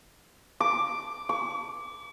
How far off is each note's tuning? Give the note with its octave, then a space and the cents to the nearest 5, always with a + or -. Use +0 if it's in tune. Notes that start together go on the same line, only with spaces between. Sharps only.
D6 +0
D6 -45